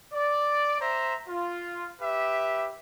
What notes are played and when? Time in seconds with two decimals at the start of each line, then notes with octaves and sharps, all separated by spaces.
0.13 D5
0.80 C5 E5 A#5
1.28 F4
2.00 G4 B4 E5